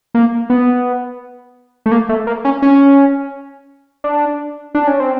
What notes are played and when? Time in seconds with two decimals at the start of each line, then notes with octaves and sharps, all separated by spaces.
0.14 A#3
0.50 B3
1.86 A3
1.92 A#3
2.09 A3
2.27 A#3
2.45 C#4
2.62 C#4
4.04 D4
4.75 D4
4.87 C#4
5.00 C4